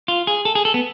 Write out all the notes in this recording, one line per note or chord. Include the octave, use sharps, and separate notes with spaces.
F4
G#4
A4
G#4
A4
B3